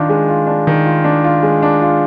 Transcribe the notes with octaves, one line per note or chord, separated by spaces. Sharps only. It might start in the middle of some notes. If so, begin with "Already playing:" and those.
Already playing: D#3 D4 F4
G#3
F4
D4
D#3
F4
D4
F4
G#3
D4
F4